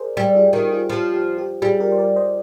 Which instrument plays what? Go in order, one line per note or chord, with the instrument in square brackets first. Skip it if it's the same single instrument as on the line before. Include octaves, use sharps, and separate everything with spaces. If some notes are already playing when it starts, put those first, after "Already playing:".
Already playing: [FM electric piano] G#4 A#4 C5 D5
[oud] G3 [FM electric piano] G4
[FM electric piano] F4 G#4
[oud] D#3 [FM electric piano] G4 A#4
[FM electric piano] F4 G#4
[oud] F3 [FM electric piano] G4
[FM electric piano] G4
G4
[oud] G3 [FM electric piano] F4 G#4
[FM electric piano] G4 A#4
C5
A#4 D5
C5 D#5